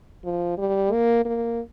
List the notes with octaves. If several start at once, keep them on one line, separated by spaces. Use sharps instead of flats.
F3
G3
A#3
A#3